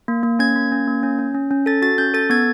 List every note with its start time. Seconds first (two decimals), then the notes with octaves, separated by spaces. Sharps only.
0.08 A#3
0.23 A#3
0.39 C#4 G#6
0.56 A#3
0.72 C#4
0.87 A#3
1.03 C#4
1.19 C#4
1.34 C#4
1.51 C#4
1.66 A4 A6
1.82 F#4 A6
1.98 C#4 G6
2.14 A4 A6
2.30 B3 G#6